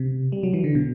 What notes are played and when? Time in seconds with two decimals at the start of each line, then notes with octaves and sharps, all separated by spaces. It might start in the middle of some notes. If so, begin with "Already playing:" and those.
Already playing: C3
0.32 G3
0.43 F#3
0.54 E3
0.64 D3
0.75 B2